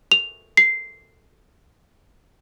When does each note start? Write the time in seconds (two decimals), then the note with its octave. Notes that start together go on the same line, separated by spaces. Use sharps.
0.12 F7
0.57 C7